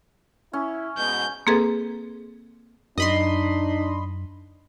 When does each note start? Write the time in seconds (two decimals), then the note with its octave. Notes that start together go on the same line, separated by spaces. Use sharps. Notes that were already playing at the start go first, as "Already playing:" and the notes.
0.53 C#4 E4
0.98 G#2 B2 G6
1.47 A#3 C4 G#4 A4 B4
2.98 F#2 D4 D#4 D#5 B5 C6